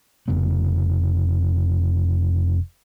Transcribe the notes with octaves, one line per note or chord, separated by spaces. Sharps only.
F1 F2 C#3 B3